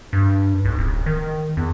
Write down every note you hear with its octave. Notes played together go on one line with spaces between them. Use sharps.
G2
B1
D1
D#3
E2